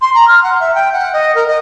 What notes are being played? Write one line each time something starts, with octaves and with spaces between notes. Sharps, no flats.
C6
A#5
F6
F#5
E5
G5
F#5
D#5
A#4
D#5